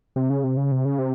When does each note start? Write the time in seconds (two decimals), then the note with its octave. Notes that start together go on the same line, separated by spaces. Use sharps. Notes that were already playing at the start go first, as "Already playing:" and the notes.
0.16 C3
0.30 C#3
0.44 C3
0.57 C#3
0.72 C3
0.85 C#3
0.99 C3